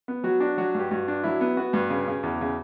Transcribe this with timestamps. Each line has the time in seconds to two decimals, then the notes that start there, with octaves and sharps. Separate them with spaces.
0.08 B3
0.24 F#3 F#4
0.40 D4 F#4
0.57 F#3 F#4
0.75 G2 G4
0.91 G2 F#4
1.08 D4
1.23 F#3 E4
1.41 B3
1.57 B3 F#4
1.73 G2
1.90 C#3
2.08 C#3
2.23 E2
2.41 C#3